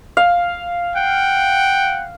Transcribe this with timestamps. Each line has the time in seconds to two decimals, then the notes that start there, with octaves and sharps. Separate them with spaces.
0.17 F5
0.95 F#5 G5